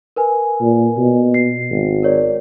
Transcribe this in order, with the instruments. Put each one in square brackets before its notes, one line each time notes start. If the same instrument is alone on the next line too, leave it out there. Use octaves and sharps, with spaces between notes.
[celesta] A#4 B4 G#5
[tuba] A#2
B2
[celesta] C7
[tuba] G#1
[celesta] A#4 C#5 D5